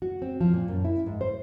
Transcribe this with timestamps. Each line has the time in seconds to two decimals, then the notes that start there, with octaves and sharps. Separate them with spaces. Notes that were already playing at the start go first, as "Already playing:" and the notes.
0.02 F#4
0.22 C4
0.40 F3
0.53 A#2
0.68 F#2
0.84 E4
1.06 G#2
1.21 C5